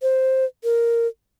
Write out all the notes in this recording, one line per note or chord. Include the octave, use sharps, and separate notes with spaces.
C5
A#4